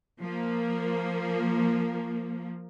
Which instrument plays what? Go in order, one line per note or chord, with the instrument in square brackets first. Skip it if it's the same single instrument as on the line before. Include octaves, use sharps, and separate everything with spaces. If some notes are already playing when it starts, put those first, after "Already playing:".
[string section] F3 A#3